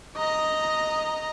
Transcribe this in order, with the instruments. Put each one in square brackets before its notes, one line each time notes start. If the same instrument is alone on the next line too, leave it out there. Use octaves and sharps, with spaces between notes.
[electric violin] D#5 A#5